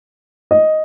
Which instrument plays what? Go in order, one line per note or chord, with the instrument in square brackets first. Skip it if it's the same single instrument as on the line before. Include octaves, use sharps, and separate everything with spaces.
[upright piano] D#5